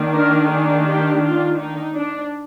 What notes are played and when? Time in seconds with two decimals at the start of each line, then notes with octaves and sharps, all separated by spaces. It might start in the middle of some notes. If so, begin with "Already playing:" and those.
Already playing: D#3 A#3 D4
0.13 A#4
0.49 G#4
0.86 G4
1.22 F4
1.59 D#4
1.95 D4